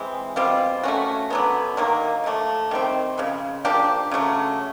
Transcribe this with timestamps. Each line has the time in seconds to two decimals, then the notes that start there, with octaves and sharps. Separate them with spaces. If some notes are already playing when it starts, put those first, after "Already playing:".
Already playing: E3 G#3 C4
0.36 B2 G3 C4 F4
0.83 A3 C#4 F#4
1.30 D3 F#3 B3
1.77 D#3 F#3 A#3
2.24 D3 F3 A3
2.71 D#3 G3 C4
3.18 C#3 F3 G#3
3.65 F3 A#3 D4 G4
4.11 C#3 F#3 A3